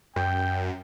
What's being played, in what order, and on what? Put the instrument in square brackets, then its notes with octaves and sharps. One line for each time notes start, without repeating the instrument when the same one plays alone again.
[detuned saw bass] F#2 [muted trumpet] G5